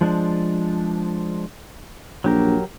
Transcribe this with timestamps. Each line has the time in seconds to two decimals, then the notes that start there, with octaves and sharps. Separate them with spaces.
0.01 F3 G#3 D4
2.24 A#1 F#3 G4 A#4